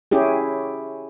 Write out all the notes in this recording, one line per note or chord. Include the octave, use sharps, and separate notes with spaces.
C#4 E4 G4 G#4